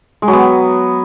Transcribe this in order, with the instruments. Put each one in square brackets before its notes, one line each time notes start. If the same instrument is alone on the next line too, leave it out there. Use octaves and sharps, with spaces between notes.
[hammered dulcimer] G#3
F#3
B3